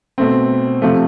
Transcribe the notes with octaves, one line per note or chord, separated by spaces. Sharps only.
B2 A3 C4
C3 F3 A3